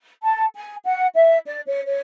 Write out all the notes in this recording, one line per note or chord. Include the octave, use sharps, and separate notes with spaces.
A5
G#5
F#5
E5
D5
C#5
C#5